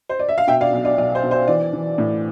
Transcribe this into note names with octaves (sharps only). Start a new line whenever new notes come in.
C5
D5
E5
F5
B2 E5 G5
D5 F5
B1
D5
B1 D5
C5
B2
C5
E3 D5
E3
A2